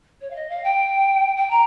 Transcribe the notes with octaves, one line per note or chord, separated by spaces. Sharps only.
C#5
F5
D#5
F5
G5
G5
A#5